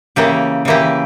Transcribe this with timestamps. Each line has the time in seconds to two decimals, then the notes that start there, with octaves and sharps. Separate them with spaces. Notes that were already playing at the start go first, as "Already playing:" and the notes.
0.16 C#3 E3 A#3 G4
0.65 C#3 E3 A#3 G4